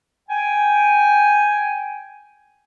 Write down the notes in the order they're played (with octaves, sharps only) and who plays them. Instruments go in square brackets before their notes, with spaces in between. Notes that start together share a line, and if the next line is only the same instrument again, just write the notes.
[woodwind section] G5 G#5